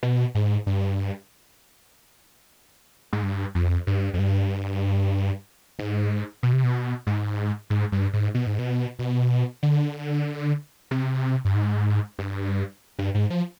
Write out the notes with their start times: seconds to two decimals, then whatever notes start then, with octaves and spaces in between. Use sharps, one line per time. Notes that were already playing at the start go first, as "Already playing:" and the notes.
0.03 B2
0.35 G#2
0.66 G2
3.13 G#2
3.23 G2
3.55 F2
3.87 G2
4.14 F2
4.19 G2
5.79 G#2
6.43 B2
6.53 C3
6.63 B2
7.07 G#2
7.70 G#2
7.92 G2
8.13 G#2
8.34 B2
8.47 G#2
8.59 B2
8.99 B2
9.63 D3
10.91 C3
11.45 G2
11.55 G#2
12.19 G2
12.99 G2
13.14 G#2
13.30 F3